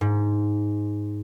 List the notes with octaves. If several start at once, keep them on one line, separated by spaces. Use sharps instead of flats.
G#2